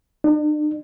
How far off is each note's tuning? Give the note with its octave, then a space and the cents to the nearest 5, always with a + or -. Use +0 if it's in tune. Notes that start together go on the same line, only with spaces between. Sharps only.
D4 +45